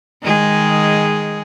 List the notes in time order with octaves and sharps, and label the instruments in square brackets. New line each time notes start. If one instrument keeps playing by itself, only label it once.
[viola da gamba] D#3 G#3 G#4